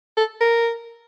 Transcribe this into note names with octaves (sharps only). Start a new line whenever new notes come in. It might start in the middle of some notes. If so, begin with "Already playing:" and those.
A4
A#4